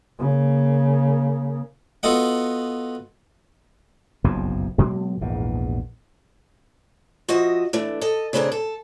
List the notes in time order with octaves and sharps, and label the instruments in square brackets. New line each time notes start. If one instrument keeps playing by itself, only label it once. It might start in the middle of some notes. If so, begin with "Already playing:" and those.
[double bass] C#3 A#3
[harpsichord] B3 F4 F#4 A4 D#5 F#5
[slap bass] F#1 B1 F2 C3
B2 F#3 G#3 A#3
A#1 E2 G#2 B2
[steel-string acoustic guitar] F3 F#4 D#5 E5
E3 A3 D4
A4 D#5
C#3 A3 C4 D4 G#4 A#4
A4